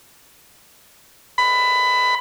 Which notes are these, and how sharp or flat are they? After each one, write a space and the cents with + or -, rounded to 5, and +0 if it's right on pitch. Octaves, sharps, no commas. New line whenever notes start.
B5 +20